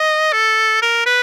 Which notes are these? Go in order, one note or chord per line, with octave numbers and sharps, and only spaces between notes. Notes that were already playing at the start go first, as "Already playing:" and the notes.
Already playing: D#5
A4
A#4
B4